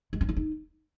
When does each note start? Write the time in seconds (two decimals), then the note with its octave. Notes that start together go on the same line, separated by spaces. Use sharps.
0.13 G#3
0.21 C#4
0.29 E4
0.36 D#4